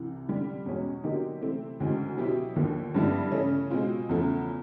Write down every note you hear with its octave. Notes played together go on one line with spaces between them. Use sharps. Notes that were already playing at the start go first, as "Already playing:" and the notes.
Already playing: C2 C3 E3
F2 D3 G3
E2 B2 G#3 C#4
D3 F#3 A#3 D#4 G4
C3 E3 A3 C4
D2 C#3 E3 G#3 C4
B2 F#3 B3 E4 G4
D#2 D3 F3 A#3
G2 D3 G3 B3 E4
C#3 E3 A3 C#4
B2 G#3 C4 F4
E2 C#3 F3 A3